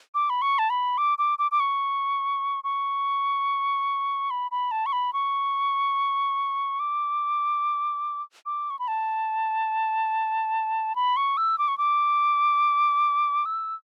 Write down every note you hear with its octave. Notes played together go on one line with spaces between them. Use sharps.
D6
B5
C#6
A5
B5
D6
D6
D6
D6
C#6
C#6
B5
B5
A5
C#6
B5
C#6
D6
D6
C#6
B5
A5
B5
C#6
E6
D6
C#6
D6
E6